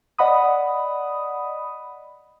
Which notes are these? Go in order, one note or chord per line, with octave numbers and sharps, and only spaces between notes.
D5 D#5 F#5 B5 D#6